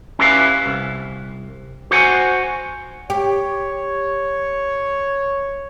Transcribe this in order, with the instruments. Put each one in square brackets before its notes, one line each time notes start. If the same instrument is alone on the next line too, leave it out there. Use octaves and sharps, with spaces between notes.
[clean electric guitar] C#4 E4 G4 B4 D#5 F5
C2
F#4 C5 F#5 G#5
[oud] G4 [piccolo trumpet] C#5